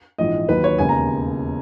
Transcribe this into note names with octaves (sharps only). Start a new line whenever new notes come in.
A#1 G#2 E3 G#3 D#5
D#2 D#3 F#3 B4
C#5
E1 D#2 C#3 G#5
A#5